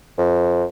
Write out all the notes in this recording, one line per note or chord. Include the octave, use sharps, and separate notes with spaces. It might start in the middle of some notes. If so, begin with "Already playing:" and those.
F2